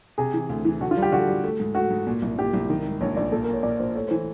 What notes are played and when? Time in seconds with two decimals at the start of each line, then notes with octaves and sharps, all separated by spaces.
0.18 C3 G#4
0.34 E3
0.49 D2
0.65 E3
0.81 D3 F#4
0.91 F4
0.97 G3
1.02 G4
1.12 D3 F#4
1.28 G3
1.44 A3
1.60 G#2
1.75 A3 F#4
1.90 G#2
2.07 A#2
2.22 C2
2.38 A#2 G4
2.54 C2
2.70 D#3
2.85 G#2
3.00 A#1 C#5
3.17 A#1 D5
3.32 A#2 A4
3.43 A#4
3.48 A#2 C#5
3.63 A#2 D5
3.80 A#2 C5
3.95 A3 C#5
4.08 E3 C5